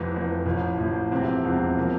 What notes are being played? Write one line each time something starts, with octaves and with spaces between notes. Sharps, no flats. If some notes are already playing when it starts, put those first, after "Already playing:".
Already playing: F1 F2 E3
F1 F2 E3
A1 A2 F3
A1 A2 F3
E1 E2 C3 F3 C4
E1 E2 C3 F3 C4
C3 F3 A#3